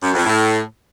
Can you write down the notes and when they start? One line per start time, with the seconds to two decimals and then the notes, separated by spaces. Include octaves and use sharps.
0.02 F#2
0.14 F2
0.26 A2